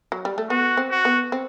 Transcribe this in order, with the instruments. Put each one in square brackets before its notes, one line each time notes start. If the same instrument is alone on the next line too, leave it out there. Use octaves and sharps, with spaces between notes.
[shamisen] F#3
G3
A3
[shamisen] B3 [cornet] F#4
[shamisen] C4
[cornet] F#4
[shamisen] B3
C4